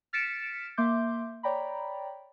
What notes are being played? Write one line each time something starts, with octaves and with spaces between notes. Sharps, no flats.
F6 A6 B6 C#7 D7 E7
A#3 E5 C6 D6 G6
C#5 D5 G5 A#5 B5